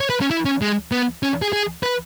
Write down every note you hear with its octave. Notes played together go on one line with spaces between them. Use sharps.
C#5
B4
C#4
E4
C#4
G#3
B3
C#4
G#4
G#4
B4